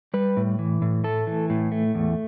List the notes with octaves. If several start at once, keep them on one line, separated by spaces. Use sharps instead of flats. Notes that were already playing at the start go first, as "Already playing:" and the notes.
G3 B4
A2
E3
A2
A3 A4
E3
A2
A3
E2